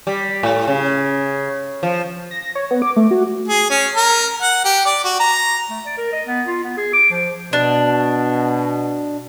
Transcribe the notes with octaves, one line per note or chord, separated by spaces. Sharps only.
G3
A2
C#3
F3
A#6
C#5
B3
D6
A3
F#4
G#4
C#4
A#4
F#5
G4
D5
F#4
A#5
A3
D5
A#4
D#5
B3
F4
B3
G#4
D6
F3
B2 D4